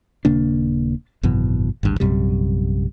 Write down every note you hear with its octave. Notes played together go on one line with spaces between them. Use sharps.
D#1 C#3 A#3 D4
G#1 F#2 B2 E3
G#1 D2 G2
A#1 F#2 C3 G3